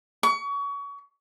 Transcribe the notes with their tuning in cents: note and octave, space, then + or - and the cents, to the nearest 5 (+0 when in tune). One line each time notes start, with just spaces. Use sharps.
C#6 +30